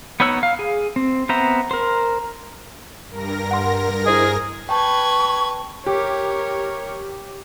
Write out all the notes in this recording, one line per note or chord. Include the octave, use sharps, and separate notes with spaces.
B3 D#4 C#5 F#5 E6
F5
G#4
C4
B3 C4 C5 E5 A#5
A#4 C5
G2 A#4 A#6
F#5 C6
E4 G#4 C5 D#5
B4 G5 A5 C#6 G#6
G4 A#4 C#5